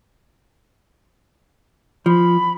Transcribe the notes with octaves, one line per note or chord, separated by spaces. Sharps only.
F3 B5